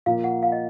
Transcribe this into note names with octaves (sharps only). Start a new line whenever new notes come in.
A#2 F3 A#3 F5
F#5
F5
D#5